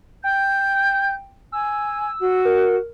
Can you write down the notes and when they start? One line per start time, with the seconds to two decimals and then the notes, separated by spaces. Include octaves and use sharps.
0.24 G5 G6
1.52 G#5 E6
2.19 F#4
2.45 A#4